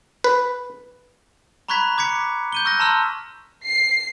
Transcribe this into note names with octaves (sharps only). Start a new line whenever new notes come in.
B4
A#5 B5 C#6 F#6 G#6 B6
D6 G#6 B6 C#7
G6 D#7 G7
C#6 E6 F#6 G6 A#6
A5 A#5 C6 E6 F6
C7